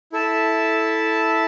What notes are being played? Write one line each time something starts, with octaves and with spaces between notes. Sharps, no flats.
E4 A4 E5 A5